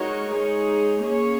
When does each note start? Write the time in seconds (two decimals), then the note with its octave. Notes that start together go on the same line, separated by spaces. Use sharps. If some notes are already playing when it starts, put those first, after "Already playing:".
Already playing: G#3 D#4 F#4 A#4 C#5
0.31 G#3 D#4 G#4 C#5
1.02 A#3 C#4 G#4 C#5